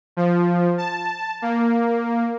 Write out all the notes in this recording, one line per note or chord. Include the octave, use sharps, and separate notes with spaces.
F3
A5
A#3